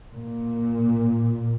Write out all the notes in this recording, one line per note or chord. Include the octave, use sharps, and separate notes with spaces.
A#2